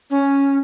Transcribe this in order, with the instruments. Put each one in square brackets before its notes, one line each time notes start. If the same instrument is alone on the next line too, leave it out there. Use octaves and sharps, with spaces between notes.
[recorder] C#4